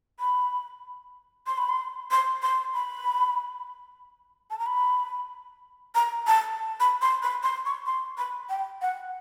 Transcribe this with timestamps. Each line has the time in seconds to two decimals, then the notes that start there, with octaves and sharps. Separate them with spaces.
0.20 B5
1.47 C6
1.58 B5
1.69 C6
2.11 C6
2.42 C6
2.74 B5
4.50 A5
4.59 A#5
4.66 B5
5.95 A#5
6.27 A5
6.80 B5
7.02 C6
7.23 B5
7.43 C6
7.65 C#6
7.86 C6
8.18 B5
8.49 G5
8.82 F#5